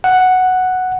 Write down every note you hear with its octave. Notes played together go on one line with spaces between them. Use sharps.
F#5